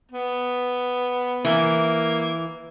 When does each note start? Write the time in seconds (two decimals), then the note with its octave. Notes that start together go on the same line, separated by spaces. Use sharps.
0.11 B3
1.45 E3 A#3